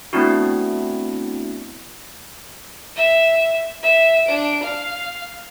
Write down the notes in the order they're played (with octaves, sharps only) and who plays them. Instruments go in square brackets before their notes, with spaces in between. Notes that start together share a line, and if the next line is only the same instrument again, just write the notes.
[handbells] A3 B3 C4 D4 E4 F#4
[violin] E5
E5
D4 D7
F5